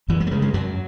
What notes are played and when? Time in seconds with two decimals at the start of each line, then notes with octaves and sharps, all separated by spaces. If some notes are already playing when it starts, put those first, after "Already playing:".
0.08 F#2 E3
0.20 G#3
0.27 A3
0.31 C#3 G#3
0.42 G#3
0.54 F#2 F#3